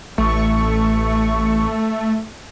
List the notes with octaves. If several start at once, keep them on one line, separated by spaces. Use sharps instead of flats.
A1 A3 C#6